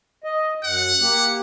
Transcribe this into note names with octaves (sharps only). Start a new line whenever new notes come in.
D#5
F#2 F#5
A#3 G4